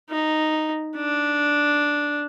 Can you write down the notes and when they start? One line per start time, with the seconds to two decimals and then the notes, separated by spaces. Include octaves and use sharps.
0.10 D#4
0.97 D4